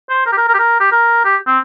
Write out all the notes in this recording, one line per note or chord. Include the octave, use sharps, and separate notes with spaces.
C5
A#4
G4
A#4
A#4
G4
A#4
G4
A#4
G4
C4